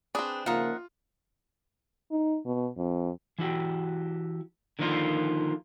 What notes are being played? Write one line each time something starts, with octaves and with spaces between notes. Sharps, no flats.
C4 D4 G#4 B4
C#3 F3 A#3 D#4 F4 E5 F#5
D#4
B2
F2
E3 E4 F#4 G4
D3 D#3 F3 A#3 D#4 F4